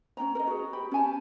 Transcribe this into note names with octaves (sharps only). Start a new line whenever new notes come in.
C#4 D4 G5 A#5
A#4 D#5
F#4 G#4
G4 B5
C#4 G4 G#5 A5